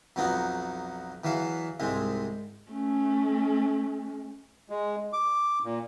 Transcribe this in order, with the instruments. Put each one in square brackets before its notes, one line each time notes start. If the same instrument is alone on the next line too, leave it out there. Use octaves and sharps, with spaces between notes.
[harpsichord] B1 F2 F#3 B3 D#4 F#5
E2 E3 F#3 E5 F5
C2 G#2 G#3 C4
[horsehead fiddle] A3 C#4
[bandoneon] G#3
D6
A#2